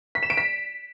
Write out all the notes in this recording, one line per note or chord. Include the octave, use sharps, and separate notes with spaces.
B6
E7
D7
B6